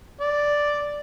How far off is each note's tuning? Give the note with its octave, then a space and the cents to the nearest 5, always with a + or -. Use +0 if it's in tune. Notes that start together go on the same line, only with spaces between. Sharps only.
D5 +0